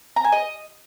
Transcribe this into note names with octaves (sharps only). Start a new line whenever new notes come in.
A#5
G#5
D#5